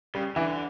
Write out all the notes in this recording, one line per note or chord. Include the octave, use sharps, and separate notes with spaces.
C#3 G3
D3 E3